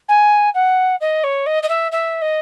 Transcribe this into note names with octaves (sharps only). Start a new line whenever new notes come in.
G#5
F#5
D#5
C#5
D#5
D#5
E5
E5
D#5